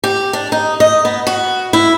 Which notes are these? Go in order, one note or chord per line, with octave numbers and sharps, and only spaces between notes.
G4
D4
D#4
D#5
B3
F#4
E4